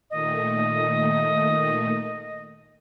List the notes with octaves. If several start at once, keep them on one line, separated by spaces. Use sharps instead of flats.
A#2 D#3 A3 D#5